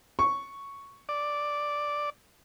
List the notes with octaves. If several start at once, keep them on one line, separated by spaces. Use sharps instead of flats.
C#6
D5